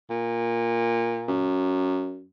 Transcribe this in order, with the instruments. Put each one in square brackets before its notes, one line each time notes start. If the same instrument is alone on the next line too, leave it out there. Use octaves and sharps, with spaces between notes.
[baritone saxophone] A#2
[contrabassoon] F#2